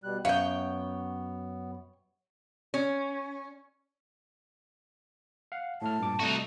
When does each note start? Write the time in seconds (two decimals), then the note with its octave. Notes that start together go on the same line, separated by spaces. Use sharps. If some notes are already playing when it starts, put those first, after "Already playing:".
0.04 B2 G3 F#6
0.25 F#2 B3 C#5 F5 G5
2.74 C#4
5.52 F5 F#5
5.82 A2 A3 A5 F6
5.99 G2 A#2 D6
6.20 C3 G3 A3 D#4 F#4